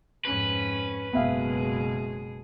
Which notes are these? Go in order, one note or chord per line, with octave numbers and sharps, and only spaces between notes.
F2 G#2 C#4 B4
F#1 B2 G#3 B3 G#4 E5 F5